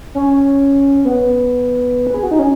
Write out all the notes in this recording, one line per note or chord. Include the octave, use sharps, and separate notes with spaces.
C#4
B3
B4
G#4
F#4
D#4
C#4